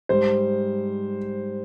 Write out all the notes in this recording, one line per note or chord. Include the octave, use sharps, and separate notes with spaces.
G#2 G3 C5